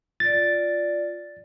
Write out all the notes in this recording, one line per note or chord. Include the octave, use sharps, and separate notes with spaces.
F4 D5 A6